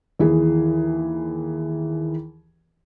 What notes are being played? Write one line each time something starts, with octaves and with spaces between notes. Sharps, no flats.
D#2 E3 G#4